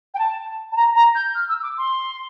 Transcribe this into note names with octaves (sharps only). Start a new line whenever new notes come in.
G5
A5
A5
A#5
A#5
G6
F6
E6
D6
C6